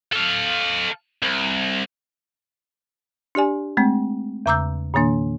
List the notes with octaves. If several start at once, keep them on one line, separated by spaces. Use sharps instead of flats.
A4 F5
C2
D4 G4 D5 G#5
G#3 A3 C4
E2 C#3 A#5 D6 E6 G6
A#2 D#3 A#3 D4